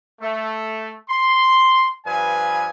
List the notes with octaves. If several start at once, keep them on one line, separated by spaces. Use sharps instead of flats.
A3
C6
G2 F3 B4 G#5